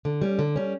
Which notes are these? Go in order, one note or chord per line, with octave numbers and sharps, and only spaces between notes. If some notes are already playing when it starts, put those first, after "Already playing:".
D3
G3 C#4
D3
G3 C#4